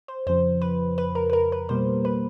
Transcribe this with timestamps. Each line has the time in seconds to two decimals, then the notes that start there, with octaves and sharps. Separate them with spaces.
0.08 C5
0.27 F2 C#3 F3 C5
0.61 B4
0.98 B4
1.15 A#4
1.30 B4
1.33 A#4
1.52 B4
1.69 B2 G3 A#3 C5
2.05 B4